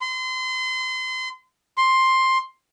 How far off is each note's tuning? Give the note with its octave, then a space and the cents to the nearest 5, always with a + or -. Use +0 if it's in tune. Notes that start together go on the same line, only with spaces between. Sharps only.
C6 -30
C6 +10